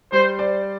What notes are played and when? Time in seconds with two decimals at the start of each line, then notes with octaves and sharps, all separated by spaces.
0.12 G3 C5
0.39 D5